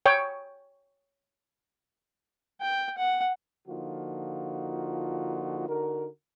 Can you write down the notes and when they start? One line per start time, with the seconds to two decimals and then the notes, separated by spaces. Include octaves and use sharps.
0.06 C#5 G5
2.61 G5
2.98 F#5
3.68 D3 F3 A#3 D#4 F4 F#4
5.68 D3 D#4 F#4 A#4